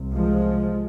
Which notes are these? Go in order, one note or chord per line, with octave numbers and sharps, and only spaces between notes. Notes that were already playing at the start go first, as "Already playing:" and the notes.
Already playing: C2 C3
F3 G#3